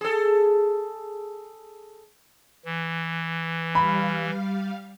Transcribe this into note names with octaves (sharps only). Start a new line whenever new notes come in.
G#4 A4
E3
G3 F5 B5